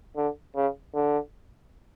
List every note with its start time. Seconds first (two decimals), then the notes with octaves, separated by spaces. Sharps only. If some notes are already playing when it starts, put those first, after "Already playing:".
0.17 D3
0.56 C#3
0.95 D3